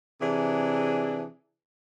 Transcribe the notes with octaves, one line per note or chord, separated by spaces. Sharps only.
C3 E3 D4 G#4